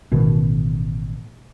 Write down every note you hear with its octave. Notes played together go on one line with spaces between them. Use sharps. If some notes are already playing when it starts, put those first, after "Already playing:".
A1 B2 D#3